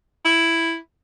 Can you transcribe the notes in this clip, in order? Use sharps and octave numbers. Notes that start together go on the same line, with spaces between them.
E4